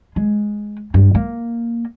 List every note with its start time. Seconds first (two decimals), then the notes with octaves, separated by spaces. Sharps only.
0.16 G#3
0.94 G2
1.15 A#3